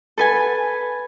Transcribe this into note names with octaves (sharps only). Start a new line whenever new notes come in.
A4 B4 G#5